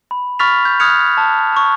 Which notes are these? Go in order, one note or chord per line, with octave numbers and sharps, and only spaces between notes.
B5
B5 C#6 F6 A6 B6 F7
G6
D#6 F6 F#6 G#6 C#7 F7
A5
A5 C#6